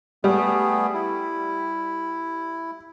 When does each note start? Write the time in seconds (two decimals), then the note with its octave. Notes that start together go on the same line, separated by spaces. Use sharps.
0.24 G3 A3 B3 G#4
0.94 E4